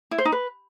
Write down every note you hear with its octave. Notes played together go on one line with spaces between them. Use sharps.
E4
C5
D#4
B4